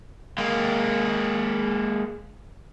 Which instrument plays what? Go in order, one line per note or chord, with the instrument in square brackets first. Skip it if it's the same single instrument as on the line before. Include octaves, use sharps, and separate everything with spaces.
[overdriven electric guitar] G#3 A#3